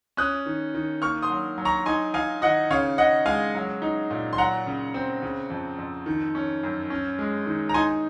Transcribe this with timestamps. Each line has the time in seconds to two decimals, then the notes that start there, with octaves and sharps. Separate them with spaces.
0.17 C#4 D#6 F#6
0.46 D#3
0.74 D#3
1.02 A#3 C#6 F6
1.22 C6 D#6
1.30 F#3
1.58 F#3
1.65 A#5 C#6
1.86 D#4 G#5 C6
2.14 D#4 F5 G#5
2.42 D#3 D#5 F#5
2.70 C#3 C#5 F5
2.98 C#3 D#5 F#5
3.26 G#3 F5 G#5
3.55 F#3
3.82 D#4
4.10 A#2
4.33 C6
4.38 F#3 F#5 A#5
4.66 C#3
4.94 C4
5.22 C#3
5.50 F2
5.79 F2
6.06 D#3
6.35 C#4
6.63 F#2
6.90 C#4
7.19 G#3
7.46 D#3
7.69 A#5
7.74 D#4 G#5 C6